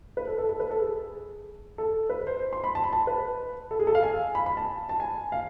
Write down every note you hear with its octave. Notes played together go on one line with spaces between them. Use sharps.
B4
A4
A4
A4
B4
A4
G#4
A4
B4
C5
C6
B5
A5
B5
A5
B4
A4
G#4
A4
F5
G#5
B5
B5
A5
A5
G#5
F5